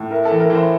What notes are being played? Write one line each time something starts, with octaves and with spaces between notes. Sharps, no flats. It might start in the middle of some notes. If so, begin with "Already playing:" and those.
Already playing: A2
E4 A#4
A4
E3
A#4
E3
C5